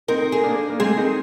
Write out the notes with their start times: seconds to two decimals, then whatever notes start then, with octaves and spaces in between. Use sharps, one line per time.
0.08 C4 D#4 A#4
0.32 G#4
0.43 A#3 D4
0.70 A#3
0.80 G#3 C4 G#4
0.97 C4 D#4